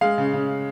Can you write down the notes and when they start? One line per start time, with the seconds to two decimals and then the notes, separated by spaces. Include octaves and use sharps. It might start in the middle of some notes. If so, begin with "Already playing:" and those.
0.01 G#3 F5
0.18 C#3
0.33 C#3